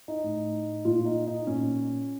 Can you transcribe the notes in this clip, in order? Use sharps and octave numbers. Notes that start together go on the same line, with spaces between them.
D#4
A2
A#2 F4
D#4
D#4
A#2 C#4